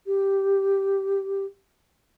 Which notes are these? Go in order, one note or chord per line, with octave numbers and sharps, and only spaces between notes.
G4